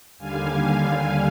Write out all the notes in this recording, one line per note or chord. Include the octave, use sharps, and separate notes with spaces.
D#2 D3 G3 F5 G#5